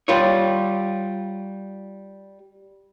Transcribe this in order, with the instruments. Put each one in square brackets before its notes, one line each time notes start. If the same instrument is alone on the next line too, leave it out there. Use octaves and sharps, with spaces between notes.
[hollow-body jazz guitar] G3 F4 C#5